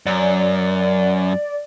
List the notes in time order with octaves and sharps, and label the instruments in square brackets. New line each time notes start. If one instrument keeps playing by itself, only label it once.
[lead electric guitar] F#2 [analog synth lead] D5